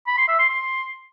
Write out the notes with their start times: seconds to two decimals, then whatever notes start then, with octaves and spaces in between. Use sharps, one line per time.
0.07 B5
0.18 C6
0.28 E5
0.39 C6
0.49 C6